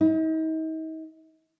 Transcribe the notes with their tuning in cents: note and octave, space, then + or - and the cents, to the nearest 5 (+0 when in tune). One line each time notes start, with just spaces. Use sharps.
D#4 +40